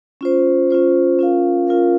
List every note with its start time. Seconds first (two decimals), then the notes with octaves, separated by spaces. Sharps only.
0.21 C#4 F4 C5
0.70 C#4 F4 C5
1.19 C#4 F4 A#4 F5
1.67 C#4 F4 A#4 F5